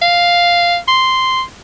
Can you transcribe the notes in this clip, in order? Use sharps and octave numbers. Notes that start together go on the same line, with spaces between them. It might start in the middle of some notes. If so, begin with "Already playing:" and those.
F5
C6